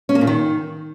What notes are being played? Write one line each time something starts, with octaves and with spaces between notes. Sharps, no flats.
C#4
A#3
A#2
D#3